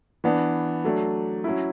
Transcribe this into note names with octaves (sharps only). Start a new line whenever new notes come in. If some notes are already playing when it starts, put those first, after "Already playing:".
E3 B3 D4
F#3 A3 D4
F#3 C#4 E4